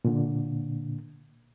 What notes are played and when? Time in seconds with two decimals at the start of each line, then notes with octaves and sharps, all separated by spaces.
0.05 A#2 D3